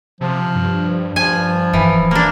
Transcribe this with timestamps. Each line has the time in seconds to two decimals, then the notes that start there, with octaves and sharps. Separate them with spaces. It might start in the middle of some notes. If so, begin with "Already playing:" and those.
0.21 C3 F3
0.55 G2
1.16 G2 F3 G#5
1.73 D#1 E3
2.11 A#3 D4